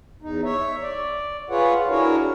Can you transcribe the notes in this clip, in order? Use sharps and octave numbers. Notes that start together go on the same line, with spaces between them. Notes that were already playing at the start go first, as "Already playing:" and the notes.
E2 D#4
C#5 E5
D5
F4 G#4 B4 C#5 F#5
D4 E4 F#4 G#4 A#4 C#5